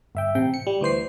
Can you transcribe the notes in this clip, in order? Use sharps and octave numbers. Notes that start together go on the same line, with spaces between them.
G1 E5 G5
A1 C3 G5
C#7
G3
D2 E3 C5 C7